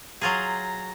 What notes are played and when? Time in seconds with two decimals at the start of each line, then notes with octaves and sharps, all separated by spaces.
0.21 F#3 F4 G#4 A#5